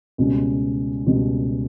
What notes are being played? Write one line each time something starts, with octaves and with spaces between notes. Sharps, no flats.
C#2 B2 G3 C#4
C#2 B2 G3 C#4